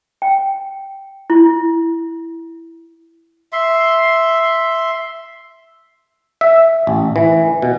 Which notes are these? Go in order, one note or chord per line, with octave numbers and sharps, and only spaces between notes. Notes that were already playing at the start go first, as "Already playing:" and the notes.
G5
E4
E5 C6
E5
A1
E3
B2